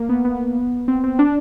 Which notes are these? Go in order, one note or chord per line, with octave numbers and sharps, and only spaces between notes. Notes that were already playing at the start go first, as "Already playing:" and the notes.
Already playing: A#3
B3
B3
C4
C4
D4